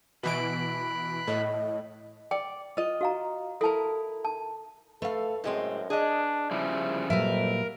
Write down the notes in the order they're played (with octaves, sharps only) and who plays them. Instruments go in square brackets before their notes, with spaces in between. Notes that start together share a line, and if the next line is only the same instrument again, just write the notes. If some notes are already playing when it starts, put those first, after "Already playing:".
[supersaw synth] B2 E3 D7 [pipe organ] B5 F#6
[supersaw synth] A2 [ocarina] D#5
[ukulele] D5 [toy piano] G5
[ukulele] F4 D#5
[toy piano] F#4 F5 A#5
[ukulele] E4 A#4 [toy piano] A4 A5
[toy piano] A5
[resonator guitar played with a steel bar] A3 F5 [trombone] A4 [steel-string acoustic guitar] B4
[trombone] F#2 [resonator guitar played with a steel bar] A2 G#3 C4
[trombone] D4 [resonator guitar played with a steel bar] G#4 D#5
[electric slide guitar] C#3 F3 G3 [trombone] E4
[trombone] F2 [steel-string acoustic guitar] A#2 F#3 G3 [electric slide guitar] A#4 [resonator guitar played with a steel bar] B4 E5